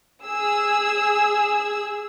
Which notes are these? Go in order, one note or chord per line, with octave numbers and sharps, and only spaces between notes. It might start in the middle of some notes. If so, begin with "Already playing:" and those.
G#4 E6